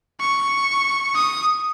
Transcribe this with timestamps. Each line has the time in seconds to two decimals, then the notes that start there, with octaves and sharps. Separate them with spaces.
0.21 C#6
1.15 D#6